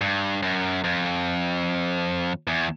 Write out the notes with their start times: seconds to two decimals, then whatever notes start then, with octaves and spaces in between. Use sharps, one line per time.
0.01 G2
0.42 F#2
0.84 F2
2.47 E2